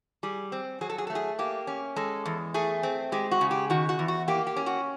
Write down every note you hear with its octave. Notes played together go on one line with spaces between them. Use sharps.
G3 G#4
C4
F#3 G#4
A4
G#4
A4
A3
G#4
A#3 G4
C#4
G#3 A4
E2
A3 G#4
C4
G#3 G4
F#4
C#3
G4
D#3 F#4
F#4
E2
F#4
A#3 G4
G4
C#4
F#4